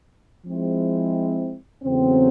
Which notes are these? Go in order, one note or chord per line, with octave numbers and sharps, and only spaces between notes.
F3 G#3 C4 E4
E2 C#3 F#3 A3 C4